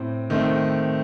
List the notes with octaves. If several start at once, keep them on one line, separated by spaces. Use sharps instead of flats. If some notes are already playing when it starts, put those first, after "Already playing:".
Already playing: A2 C4
D#3 A3 C4